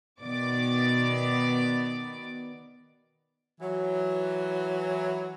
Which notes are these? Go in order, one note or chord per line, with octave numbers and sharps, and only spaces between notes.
B2 D#3 B3 D5 D6
E3 F#3